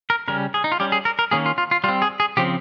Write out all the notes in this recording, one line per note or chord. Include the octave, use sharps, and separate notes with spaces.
A#4
C#3 G3 C#4 A#4
G#4
D#4
F4
G3 C#4 G4
G#4
A#4
A#4
D#3 A#3 C#4 G#4
F4
F4
F4
G3 C4 F4
G#4
G#4
C#3 F3 C4 G4